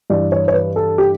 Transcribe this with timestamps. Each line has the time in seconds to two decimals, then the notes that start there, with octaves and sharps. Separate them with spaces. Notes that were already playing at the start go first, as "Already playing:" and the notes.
0.10 G2 E3 D5
0.32 C#5
0.48 C#5
0.54 B4
0.76 A4
0.98 G4